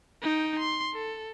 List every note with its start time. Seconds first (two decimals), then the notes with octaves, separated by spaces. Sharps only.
0.22 D#4 G5
0.59 C6
0.94 A4